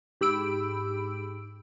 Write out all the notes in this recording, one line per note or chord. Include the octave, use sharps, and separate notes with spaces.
G#2 G4 B5 E6 D7